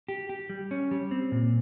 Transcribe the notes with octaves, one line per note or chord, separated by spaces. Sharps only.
G4
G4
G3
C#4
G3
C4
A#2